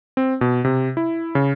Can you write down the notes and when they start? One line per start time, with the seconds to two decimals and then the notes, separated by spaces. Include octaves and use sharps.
0.17 C4
0.41 B2
0.65 C3
0.97 E4
1.35 C#3